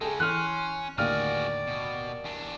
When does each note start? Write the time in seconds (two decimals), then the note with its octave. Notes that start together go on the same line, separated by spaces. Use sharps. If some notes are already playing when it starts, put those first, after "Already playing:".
0.01 C#3 G#3 G#4 A4 G5
0.20 E3 C#4 C6 F6 F#6
0.98 D#2 A2 D3 F#4 G#4 D5 F5 F6
1.67 B2
2.24 E2 D4